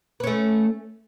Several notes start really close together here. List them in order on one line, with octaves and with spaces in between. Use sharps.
B4 C#4 A3